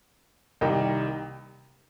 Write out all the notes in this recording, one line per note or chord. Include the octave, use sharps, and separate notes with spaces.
C2 C3 D#3 G3 A#3 D#5 G5